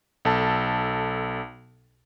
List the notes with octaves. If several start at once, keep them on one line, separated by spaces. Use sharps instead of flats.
B1 A4 A5